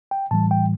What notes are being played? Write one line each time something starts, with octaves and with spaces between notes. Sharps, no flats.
G5
A2 E3 G3 A5
G5